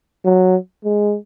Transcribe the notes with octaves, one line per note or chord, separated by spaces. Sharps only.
F#3
G#3